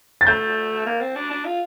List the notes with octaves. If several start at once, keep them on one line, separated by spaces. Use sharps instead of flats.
A6
A3 G6
A#3
C4
D4
D4
F4